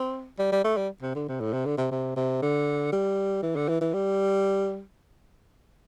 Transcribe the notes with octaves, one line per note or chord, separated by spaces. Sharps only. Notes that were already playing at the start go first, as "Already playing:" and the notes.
Already playing: C4
G3
G3
A3
G3
C3
D3
C3
A2
C3
D3
C3
C3
C3
D3
G3
E3
D3
E3
E3
G3